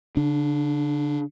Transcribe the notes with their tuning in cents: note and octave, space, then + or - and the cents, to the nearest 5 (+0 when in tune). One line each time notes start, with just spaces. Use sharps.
D3 -40 D4 +15